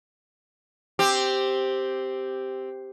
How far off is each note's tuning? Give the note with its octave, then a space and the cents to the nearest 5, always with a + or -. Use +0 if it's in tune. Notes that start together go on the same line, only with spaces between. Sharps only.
C4 +0 G4 +0